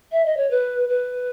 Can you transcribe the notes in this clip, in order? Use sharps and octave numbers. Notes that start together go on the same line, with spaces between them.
E5
D#5
C#5
B4
B4